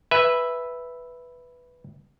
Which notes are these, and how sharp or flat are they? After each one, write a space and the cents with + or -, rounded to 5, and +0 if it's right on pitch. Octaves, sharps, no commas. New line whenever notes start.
B4 +0 E5 +0 G#5 -15